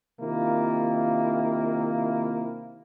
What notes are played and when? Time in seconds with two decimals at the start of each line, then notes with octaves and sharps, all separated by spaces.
0.21 C3 D#3 A#3 E4 F4